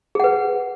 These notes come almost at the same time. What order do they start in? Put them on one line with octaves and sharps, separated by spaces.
G#4 F#5 B4